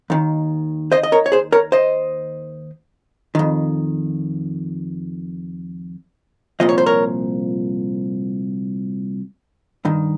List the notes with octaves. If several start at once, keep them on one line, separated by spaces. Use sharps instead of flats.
D#2 D#3
C5 D#5
D#5
A#4 C#5
C#5
G#4 C5
A#4 C#5
C5 D#5
F2 D#3
C2 A#2 F3 D#5
C#5
C5
A#4 C#5
G2 D#3